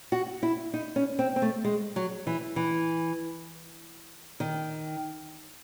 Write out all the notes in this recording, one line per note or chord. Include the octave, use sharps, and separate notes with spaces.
F#4
E4
D#4
C#4
C4
C4
A3
G#3
F#3
E3
E3
D#3